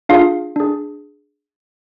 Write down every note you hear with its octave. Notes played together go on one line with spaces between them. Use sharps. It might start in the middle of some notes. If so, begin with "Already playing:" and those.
D4 F4 G#4 F5
D4 G#4